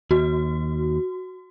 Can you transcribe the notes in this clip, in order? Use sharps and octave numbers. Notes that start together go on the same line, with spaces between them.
D#2 F#4